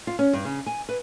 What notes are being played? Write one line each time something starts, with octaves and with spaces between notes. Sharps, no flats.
F4
C#4
G2
C#3
G#5
B4